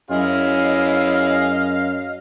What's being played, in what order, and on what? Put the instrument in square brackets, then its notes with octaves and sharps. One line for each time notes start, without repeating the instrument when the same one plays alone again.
[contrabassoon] F#2 [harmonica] C#4 E4 G#4 [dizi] D#5 [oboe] F5